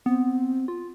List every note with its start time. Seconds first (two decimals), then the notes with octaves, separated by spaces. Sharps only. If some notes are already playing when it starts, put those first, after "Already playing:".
0.06 B3 C4
0.68 F4